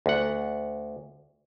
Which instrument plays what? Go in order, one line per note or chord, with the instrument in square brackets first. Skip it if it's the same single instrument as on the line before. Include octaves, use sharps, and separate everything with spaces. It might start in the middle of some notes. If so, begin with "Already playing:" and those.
[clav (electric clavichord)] D2 F#5